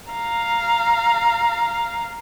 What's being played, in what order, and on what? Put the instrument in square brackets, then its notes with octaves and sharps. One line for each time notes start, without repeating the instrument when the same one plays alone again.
[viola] F5 A#5